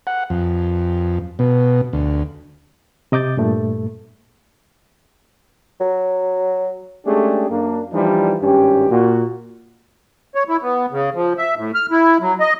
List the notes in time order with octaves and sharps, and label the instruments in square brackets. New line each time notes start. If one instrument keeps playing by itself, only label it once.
[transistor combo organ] F#5
F2
B2
D2
[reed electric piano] C3 D#5 D6 G6 A6
G2 A#2 A3
[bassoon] F#3
[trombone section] G#3 A3 C#4 D4 G4 G#4
F#2 A#3 D4
E3 F3 G3 D4 D#4 F4
G#1 G2 C#4 G4
A#2 F#4
[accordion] C#5
E4
B3
C#3
F3
E5
A2
F6
E4
F#3
D#5